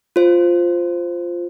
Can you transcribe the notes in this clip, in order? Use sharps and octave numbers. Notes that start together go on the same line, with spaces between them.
F4 C5